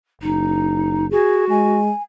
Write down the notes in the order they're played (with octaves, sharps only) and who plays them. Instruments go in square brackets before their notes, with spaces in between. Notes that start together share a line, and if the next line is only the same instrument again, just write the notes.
[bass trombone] F#1 [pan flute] D#4
[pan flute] F#4 [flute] G#4
[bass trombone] G#3 [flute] G#5